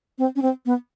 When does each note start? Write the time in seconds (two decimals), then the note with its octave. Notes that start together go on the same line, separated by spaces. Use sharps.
0.18 C4
0.36 C#4
0.42 C4
0.66 B3